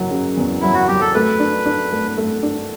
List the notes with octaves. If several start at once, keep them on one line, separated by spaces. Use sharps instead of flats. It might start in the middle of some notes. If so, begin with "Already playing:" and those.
Already playing: F#1 F#3
C#3
E2
F#3 E4
F#4
F#3 G4
A4
A3 B4
D4
D4
A3
A3
D4